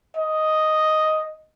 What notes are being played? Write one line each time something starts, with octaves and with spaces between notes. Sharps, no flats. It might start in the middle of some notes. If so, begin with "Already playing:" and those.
D#5